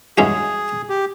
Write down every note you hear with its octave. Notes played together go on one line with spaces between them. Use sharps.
G2 E3 G#3 C#4 F#4 G#4
G4